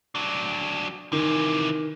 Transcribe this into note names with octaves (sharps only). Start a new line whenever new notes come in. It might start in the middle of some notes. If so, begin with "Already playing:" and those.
F#3 D4
C3 D#3 E3